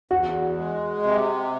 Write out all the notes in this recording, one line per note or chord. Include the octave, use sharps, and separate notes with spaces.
E2 F#4
G#3
C3